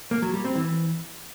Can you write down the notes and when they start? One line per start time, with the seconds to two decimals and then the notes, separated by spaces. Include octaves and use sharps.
0.11 A#3
0.22 F#3
0.33 G3
0.44 C4
0.56 E3